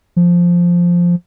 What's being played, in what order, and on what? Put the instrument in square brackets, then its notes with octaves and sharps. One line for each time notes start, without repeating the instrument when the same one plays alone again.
[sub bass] F3